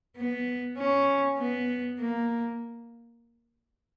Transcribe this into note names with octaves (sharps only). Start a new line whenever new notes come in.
B3
C#4
B3
A#3